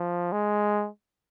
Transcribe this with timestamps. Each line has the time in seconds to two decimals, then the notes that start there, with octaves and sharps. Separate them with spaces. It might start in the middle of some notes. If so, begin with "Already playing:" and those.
Already playing: F3
0.32 G#3